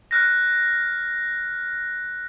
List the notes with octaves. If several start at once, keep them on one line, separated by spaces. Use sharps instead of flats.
F6 F#6 A#6